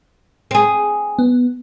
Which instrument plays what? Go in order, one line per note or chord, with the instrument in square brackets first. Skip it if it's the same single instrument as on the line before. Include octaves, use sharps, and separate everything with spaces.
[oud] C4 G#4
[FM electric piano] B3